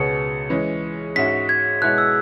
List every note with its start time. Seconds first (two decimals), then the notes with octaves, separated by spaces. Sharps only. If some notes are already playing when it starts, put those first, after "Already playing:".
Already playing: C#2 B2 B3 G#4 C#5 C#7
0.50 E3 G#3 C#4
1.16 G#2 G#3 C#4 F#4 E5 B6
1.49 G#6
1.82 B2 G#3 E4 G#4 C#5 F#6
1.98 E6